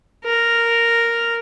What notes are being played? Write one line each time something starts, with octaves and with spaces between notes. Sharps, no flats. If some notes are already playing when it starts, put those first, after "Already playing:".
A#4